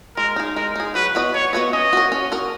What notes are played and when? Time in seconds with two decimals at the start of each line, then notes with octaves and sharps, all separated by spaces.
0.17 G#3 A#4
0.36 D#4 G#4
0.56 G#3 A#4
0.76 D#4 G#4
0.95 F#3 B4
1.15 B3 F#4 B4 D#5
1.34 F#3 C#5
1.53 B3 F#4 B4 D#5
1.73 C#4 D#5
1.93 F#4 A#4
2.12 C#4
2.32 F#4 A#4